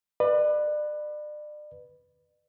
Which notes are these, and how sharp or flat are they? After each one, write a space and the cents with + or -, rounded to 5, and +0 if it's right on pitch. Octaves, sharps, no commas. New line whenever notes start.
B4 +0 D5 +35